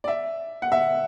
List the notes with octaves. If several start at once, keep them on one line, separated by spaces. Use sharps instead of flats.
D5
E5
F#5
E5